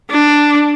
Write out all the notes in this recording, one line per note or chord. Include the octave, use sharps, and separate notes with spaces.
D4